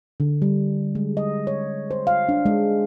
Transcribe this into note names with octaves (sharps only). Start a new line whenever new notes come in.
D3
G3
G#3
D#5
C#5
C5
F5
D4
G#3